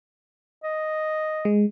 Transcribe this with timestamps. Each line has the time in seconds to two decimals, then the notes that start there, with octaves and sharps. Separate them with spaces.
0.64 D#5
1.45 G#3